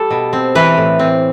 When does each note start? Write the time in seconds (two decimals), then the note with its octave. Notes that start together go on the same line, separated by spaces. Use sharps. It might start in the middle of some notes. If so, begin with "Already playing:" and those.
Already playing: G3 A4
0.11 B2
0.33 C4
0.55 E3 B4
0.77 A2
0.99 C4